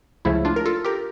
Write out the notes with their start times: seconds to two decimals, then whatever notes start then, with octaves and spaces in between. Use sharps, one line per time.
0.25 C#2 C#3 F3 A3 E4
0.45 D4 F4
0.56 A#4
0.66 F4 A4
0.85 G4 A#4